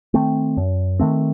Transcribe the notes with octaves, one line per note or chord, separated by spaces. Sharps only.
D#3 A3 C4
F#2
D#3 A3 C4